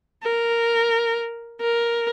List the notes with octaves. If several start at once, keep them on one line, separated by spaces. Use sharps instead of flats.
A#4
A#4